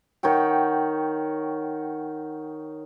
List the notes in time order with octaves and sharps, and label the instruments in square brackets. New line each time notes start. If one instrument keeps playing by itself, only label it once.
[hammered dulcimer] D#3 C#5 F#5 G5